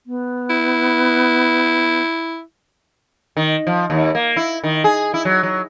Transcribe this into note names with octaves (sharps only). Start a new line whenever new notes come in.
B3
E4
D#3
F3
D#2
A#3
E4
D#3
G#4
E4
F#3
F#3